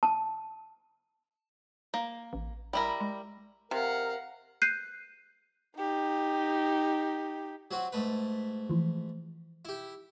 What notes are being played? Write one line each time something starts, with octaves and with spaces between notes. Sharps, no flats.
A5
A#3
A1
G3 E4 A#4
G#3
C3 A#4 F5 F#5
F#6 G6 C7 D#7
D#4 G4
F#3 C4 F#4
G#2 A3 B4
E3 F3
E4 G4